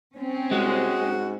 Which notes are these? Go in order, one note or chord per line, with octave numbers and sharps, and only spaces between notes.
C4 C#4
C2 G#3 F#4
G#2